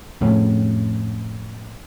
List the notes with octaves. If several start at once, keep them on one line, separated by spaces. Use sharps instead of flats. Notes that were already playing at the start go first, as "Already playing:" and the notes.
F2 A2 A3 C#4